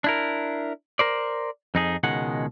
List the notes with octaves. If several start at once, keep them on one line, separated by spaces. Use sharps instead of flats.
D4 E4 A#4
A#4 C5 D5
F2 D#4 G#4
C#2 B2 D#3 G#3 F#5